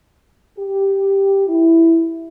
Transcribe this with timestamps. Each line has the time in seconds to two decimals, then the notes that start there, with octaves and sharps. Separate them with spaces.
0.58 G4
1.47 E4